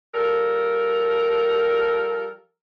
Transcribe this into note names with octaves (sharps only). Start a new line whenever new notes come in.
F3 G3 A4 A#4